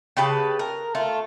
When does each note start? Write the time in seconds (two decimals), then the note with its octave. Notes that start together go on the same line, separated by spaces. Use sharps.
0.17 C#3 G4 B4 A5
0.59 A#4
0.95 A3 F4